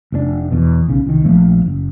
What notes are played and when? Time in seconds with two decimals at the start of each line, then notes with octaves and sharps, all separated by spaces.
0.12 F1 A2 D4
0.51 E2 B2
0.88 B1 C#3
1.06 C2 D#3
1.25 A#1 F3 A3 A#3
1.66 F#1